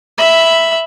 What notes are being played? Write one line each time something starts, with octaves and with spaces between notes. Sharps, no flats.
E5 B5